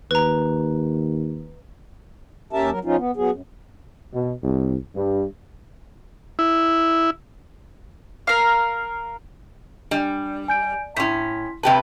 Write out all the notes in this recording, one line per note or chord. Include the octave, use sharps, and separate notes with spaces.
D#2 B4 A#5
D#2 C#4 G4 A#4 E5 A5
F#3 A#4
F3 C#4 D#4 F4
B3
F#3 B3 G#4
F#2
B2
C2
G2
E4
A#4 F5
G3 D4
G#5 G6 D7
A2 C#4 E4 C6 B6
C3 G4 B4 A5